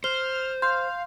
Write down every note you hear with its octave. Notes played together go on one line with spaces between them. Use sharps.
C5 F6 G7
F5 C6 G6